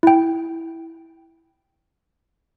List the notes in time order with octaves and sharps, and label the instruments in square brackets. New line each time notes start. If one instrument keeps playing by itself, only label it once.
[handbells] E4 G5